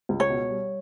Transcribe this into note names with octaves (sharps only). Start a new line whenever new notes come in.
C#2
C#5
B2
G3